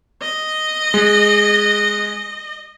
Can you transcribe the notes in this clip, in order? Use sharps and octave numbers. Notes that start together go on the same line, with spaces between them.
D#5
G#3